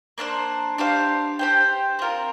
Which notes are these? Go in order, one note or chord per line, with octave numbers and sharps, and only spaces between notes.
A#3 D4 A4 C5
D4 G4 C5 F5
G4 C5 G5
C4 F4 A#4